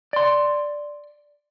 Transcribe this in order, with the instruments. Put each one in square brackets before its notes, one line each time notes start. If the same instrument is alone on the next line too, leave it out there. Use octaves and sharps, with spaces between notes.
[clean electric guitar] D5 C6